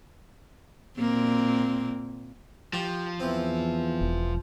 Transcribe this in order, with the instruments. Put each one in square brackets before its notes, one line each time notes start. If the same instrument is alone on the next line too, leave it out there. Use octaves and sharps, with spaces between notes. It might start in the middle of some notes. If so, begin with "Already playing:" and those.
[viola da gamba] A#2 A#3 C4
[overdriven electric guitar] F3 [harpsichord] G4
[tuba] E2 [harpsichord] E3 C4
[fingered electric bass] E1